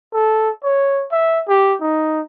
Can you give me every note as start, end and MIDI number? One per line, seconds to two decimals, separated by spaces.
0.13 0.50 69
0.63 1.05 73
1.12 1.41 76
1.48 1.75 67
1.81 2.20 63